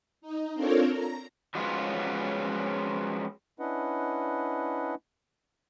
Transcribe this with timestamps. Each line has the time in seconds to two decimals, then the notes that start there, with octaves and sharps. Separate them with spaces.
0.22 D#4
0.54 C4 D4 F4 A4 A#4 C#5
0.89 A#5
1.55 F3 F#3 G#3 B3 C#4 F4
3.60 C#4 D4 E4 B4 D#5 F#5